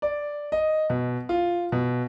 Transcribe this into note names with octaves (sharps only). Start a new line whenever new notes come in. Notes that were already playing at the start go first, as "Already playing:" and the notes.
D5
D#5
B2
F4
B2